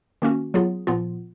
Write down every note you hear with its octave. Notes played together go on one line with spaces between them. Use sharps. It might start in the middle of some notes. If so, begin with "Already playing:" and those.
D#3 A#3 C#4 F#4
F#3 B3 F4 G#4
A#2 F3 B3 F4